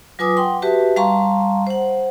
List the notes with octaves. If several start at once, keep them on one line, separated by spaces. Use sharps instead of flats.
F#3 F4 B4 G#5 D6 D#6
F#5 G5 C6
F#4 G4 B4 E5 A5
G3 F5 A5 A#5 C6 C#6
C5 F#5